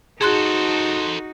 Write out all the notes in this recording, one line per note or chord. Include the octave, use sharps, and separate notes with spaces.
D#4 F#4 G#4 A4 C5 C6 F#6